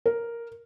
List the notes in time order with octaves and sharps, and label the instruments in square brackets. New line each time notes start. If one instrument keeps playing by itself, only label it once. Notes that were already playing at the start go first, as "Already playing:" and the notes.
[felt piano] A#4